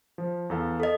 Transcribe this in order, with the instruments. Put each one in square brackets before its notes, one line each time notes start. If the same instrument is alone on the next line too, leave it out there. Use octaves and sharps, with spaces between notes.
[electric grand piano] F3
E2 A4 F5
[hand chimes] A4 D#5